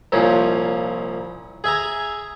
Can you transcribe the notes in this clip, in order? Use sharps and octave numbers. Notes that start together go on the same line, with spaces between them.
C2 A#2 F3 C#4
G#4 E5 G#5 A#5